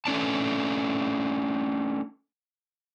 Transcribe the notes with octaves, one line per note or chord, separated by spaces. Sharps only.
A3 C#4 D4 A5